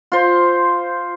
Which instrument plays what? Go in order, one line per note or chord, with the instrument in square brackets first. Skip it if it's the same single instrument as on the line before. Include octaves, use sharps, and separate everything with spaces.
[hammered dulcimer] F4 C5